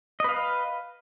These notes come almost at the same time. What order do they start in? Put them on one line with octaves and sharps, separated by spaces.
D#5 B4 F5